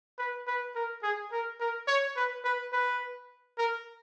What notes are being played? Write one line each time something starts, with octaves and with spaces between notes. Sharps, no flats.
B4
B4
A#4
G#4
A#4
A#4
C#5
B4
B4
B4
A#4